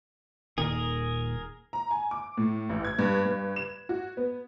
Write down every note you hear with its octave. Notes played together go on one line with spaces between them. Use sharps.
D#1 A#2 D#3 G#4 A#4
A#5
G#5
D6
A2
A1
G#6
G2
G2
E7
F#4
B3